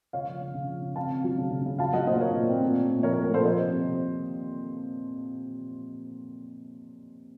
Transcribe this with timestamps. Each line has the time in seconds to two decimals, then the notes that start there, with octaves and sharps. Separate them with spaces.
0.13 C#3 C#5 F5
0.27 F3
0.41 C#3
0.55 C#3
0.69 F3
0.82 C#3
0.96 C4 F5 A5
1.10 C4
1.24 F#3
1.38 C#3
1.51 C#3
1.66 C#3
1.79 F#3 F5 A5
1.93 F#3 D#5 F#5
2.07 A#2 C5 D#5
2.20 A#2 A#4 C#5
2.34 A#2
2.48 C4
2.63 A#2
2.76 A3
2.90 A#2
3.03 F3 A#4 C#5
3.13 A#4
3.18 A3
3.24 A#4
3.32 A#2 A4 C5
3.45 F3 C5 D#5
3.59 C3
3.73 C3